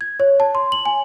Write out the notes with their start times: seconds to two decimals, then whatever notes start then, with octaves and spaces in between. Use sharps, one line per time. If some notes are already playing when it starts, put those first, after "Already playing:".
0.01 G#6
0.20 C#5
0.40 A5
0.55 C6
0.72 F#7
0.86 G#5